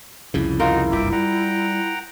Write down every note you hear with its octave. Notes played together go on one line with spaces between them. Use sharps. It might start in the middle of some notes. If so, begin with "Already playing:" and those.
C2 F2 C#3 E4
D#4 F4 F#4 A#4
F#1 C2 G2 E5 G5 D6
G3 F#5 G5 A#5